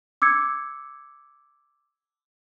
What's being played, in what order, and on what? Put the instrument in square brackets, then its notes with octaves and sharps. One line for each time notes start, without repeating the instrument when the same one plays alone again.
[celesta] D6 E6 G#6 C#7